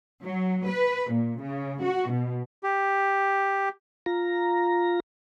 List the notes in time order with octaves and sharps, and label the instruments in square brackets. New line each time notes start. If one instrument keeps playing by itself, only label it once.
[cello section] F#3
B4
A#2
C#3
F#4
B2
[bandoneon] G4
[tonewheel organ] F4 A#5